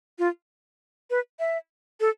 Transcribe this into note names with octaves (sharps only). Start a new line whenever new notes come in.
F4
B4
E5
A4